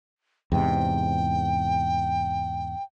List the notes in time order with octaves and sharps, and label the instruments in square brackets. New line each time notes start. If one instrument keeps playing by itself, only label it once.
[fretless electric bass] E2 G#2 C3 [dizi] G5